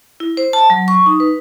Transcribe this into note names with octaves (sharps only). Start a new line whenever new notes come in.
E4
C5
A5
F#3
C#6
D#4
B4